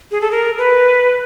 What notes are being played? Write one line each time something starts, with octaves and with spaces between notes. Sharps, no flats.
G#4
A4
A#4
B4